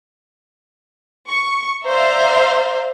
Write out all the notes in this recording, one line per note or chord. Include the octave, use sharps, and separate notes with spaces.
C#6
C5 D5 E5 F5 A#5 C6